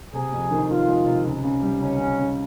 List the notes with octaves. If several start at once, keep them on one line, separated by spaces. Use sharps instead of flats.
C3 G#4
F2
D#3
D#3 F4
G#3
C3
C#2
C#3
G3
C#2 C#4
C#3
C#3